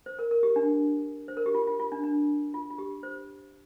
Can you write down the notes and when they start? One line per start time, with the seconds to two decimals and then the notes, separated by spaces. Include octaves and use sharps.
0.06 C5
0.19 A#4
0.31 A#4
0.43 G4
0.56 D4
1.28 C5
1.37 A#4
1.46 G4
1.55 F4
1.67 F4
1.80 F4
1.92 D4
2.04 D4
2.54 F4
2.71 F4
2.78 G4
3.03 C5